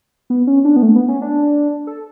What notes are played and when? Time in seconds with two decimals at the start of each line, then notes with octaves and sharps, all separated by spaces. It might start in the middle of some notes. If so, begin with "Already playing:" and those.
0.30 B3
0.47 C#4
0.65 D4
0.76 B3
0.82 A3
0.95 B3
1.08 C#4
1.22 D4
1.87 A4